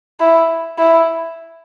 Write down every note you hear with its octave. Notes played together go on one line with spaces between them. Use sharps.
E4
E4